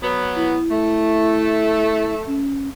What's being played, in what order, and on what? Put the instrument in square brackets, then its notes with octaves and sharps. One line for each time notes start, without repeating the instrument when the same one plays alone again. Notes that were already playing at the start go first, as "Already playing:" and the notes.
[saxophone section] F#3 B3
[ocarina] E4
[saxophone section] A3
[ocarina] C#4